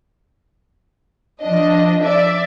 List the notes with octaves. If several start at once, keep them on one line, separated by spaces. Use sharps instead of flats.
F3 D4 D#5
D5 E5